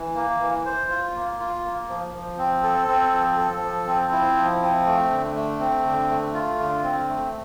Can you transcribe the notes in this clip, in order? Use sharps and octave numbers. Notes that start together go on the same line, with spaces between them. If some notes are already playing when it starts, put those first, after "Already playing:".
Already playing: E3
A#3
E3
C5
F4
A#3
F4
A#3
F3
F3
C4
A4
C4
F3
A4
F3
C4
E4
F3
C4
A3
D3
A3
C4
D3
A3
F4
D3
C4
A3